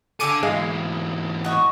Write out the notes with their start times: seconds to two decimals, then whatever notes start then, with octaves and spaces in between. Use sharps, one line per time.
0.20 D3 A4 F5 G#5 D6 E6 C#7 D#7
0.43 G#2 E3 G#3 F5
1.45 F#4 D#5 C#6